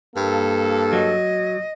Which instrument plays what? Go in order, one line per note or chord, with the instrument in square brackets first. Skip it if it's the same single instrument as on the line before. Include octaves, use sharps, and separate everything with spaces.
[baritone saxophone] G2 [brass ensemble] A#3 A4
[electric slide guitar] F#3 [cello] D#5